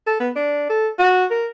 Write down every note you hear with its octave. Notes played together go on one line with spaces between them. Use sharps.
A4
B3
D4
A4
F#4
A#4